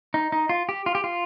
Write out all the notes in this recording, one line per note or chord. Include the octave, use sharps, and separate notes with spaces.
D#4
D#4
F4
G4
F4
G4
F4